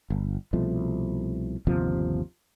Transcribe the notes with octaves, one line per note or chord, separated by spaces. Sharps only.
G1
C2 B2 F3 A3
G1 D#2 C3 F3